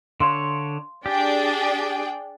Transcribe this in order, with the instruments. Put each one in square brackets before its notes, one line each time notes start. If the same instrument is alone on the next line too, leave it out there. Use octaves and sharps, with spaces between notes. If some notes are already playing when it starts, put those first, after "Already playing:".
[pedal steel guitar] D3 D4 C#5 [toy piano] F5 C6
[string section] D4 G#4 G5 [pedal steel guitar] G4